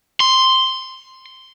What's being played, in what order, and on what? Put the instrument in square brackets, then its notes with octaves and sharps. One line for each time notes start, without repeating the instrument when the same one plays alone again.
[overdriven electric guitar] C6